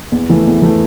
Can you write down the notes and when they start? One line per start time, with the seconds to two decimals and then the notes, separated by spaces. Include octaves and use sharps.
0.12 E2
0.29 E3 A3
0.46 E2
0.62 E3 A3